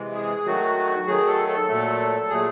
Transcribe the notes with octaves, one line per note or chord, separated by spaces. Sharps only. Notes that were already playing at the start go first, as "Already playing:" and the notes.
Already playing: C3 E3 G#3
G#4
D#3 F#3 A3 F#4
D#3 F#3 A3 G#4
A4
A4
A#2 F#3 A3
A#2 F#3 A3 G#4